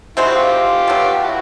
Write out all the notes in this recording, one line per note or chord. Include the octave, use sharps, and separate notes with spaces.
C3 D#3 G#3 C4 E4 F#4
F4 G4
B2 F#3 A3
E4 F#4